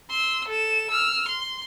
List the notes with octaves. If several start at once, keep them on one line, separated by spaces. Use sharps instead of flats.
C6 E6
A4 E7
E6 F6
C6